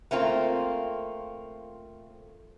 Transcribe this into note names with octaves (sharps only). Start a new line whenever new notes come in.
A3 A#3 C4 F4